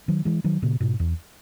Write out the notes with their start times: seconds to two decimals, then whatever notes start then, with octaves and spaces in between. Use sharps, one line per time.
0.08 D#3 F#3
0.25 E3 G#3
0.44 D#3 F#3
0.62 A#2 C#3
0.80 G#2 B2
1.00 E2